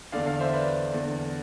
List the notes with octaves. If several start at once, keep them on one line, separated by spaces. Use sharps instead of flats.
E2 D3 D5 F5
D5 F5
C5 E5
B4 D5
E2 D3